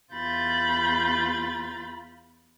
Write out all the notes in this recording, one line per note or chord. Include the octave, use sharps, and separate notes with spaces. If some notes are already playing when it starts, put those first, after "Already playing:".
E2 F4 B5 G6 A6